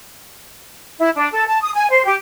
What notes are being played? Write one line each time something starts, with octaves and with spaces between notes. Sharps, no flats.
E4
D4
A4
A5
D#6
G#5
C5
G4